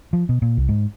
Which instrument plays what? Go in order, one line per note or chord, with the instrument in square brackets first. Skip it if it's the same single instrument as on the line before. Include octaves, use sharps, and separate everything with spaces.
[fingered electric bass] F3
B2
A#2
C2
G#2